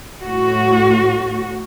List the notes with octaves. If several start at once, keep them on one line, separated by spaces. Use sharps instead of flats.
A2 F#4